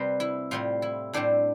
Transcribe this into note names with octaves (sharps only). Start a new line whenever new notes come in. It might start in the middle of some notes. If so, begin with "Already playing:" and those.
Already playing: C3 G3 C4 B4
E4
A2 G3 C4 F4
E4
A2 G3 C4 D4